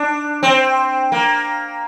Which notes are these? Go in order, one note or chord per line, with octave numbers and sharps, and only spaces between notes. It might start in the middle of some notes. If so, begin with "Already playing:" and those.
Already playing: D4
C4
A#3